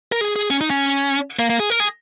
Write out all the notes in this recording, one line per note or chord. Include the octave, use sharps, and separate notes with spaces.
A#4
G#4
G#4
C#4
D#4
C#4
A#3
A#3
G#4
A#4
G#4